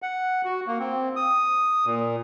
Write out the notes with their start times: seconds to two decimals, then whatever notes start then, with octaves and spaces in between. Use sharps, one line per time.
0.02 F#5
0.44 F#4
0.67 A#3
0.79 C4
1.16 D#6
1.86 A#2